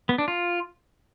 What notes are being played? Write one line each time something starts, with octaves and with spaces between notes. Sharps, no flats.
B3
D4
F4